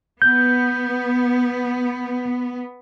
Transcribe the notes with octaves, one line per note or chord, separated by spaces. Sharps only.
B3 G6